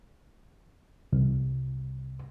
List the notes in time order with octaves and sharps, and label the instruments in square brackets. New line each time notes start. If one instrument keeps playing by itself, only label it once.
[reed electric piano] C2